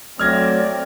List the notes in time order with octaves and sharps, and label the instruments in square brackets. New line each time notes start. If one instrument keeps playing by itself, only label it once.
[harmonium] F#3 A3 [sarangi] C4 [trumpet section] D5 [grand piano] F6 G#6 A#6